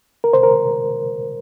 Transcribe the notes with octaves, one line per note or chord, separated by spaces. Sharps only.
A#4
C5
A#4